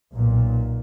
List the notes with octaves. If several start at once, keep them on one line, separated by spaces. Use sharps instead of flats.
B1 A#2